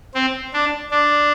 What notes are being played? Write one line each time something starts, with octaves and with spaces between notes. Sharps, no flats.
C4
D4
D4